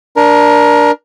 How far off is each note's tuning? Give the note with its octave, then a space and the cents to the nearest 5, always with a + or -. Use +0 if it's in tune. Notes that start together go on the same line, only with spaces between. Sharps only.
D4 +0 A#4 +20